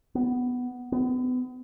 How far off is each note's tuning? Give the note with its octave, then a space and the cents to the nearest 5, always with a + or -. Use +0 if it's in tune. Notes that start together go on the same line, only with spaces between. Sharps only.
B3 +5
B3 +35